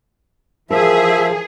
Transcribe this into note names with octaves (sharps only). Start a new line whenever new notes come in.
E3 F3 G#4 A#4 E5